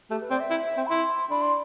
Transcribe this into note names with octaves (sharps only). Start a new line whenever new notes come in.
A3 G4
B4
C4 D5
E5
E4
C4
B5
E4 C6
D4 B5
C6